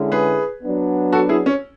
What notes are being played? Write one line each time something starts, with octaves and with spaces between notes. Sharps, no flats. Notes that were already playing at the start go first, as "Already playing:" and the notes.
Already playing: D3 G#3 C#4 E4
G#4 B4
F#3 B3 D4
F#4 A4
E4 G#4
C#4